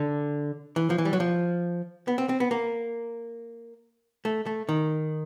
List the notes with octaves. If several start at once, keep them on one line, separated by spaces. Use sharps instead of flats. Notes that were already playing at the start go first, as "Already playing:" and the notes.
Already playing: D3
E3
F3
E3
G3
F#3
F3
B3
C4
C4
B3
A#3
A3
A3
D#3